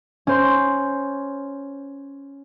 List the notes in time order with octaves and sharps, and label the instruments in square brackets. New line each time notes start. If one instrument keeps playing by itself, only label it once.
[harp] C#4 C5 C6